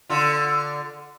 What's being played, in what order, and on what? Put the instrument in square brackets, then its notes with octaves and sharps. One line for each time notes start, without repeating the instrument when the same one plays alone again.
[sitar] D3 F4